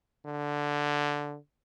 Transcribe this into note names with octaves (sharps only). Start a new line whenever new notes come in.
D3